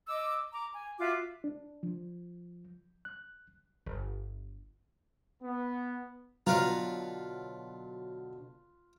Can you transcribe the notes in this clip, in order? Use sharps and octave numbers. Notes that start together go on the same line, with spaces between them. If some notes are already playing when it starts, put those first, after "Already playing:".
D#5 D6 E6
A#5 D6
G#5
F4 F#4 E5 D6
D4
F3
F#6
G1
B3
B2 D3 F#3 F4 B4 F5 A#5